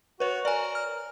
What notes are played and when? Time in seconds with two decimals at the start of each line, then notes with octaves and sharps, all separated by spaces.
0.20 F#4 B4 C#5
0.45 A#4 D5 G#5
0.75 F6